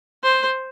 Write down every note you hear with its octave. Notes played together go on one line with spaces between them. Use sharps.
C5